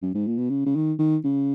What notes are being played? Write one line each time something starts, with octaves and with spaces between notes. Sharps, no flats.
F#2
G#2
A#2
B2
C#3
C#3
D#3
D#3
C#3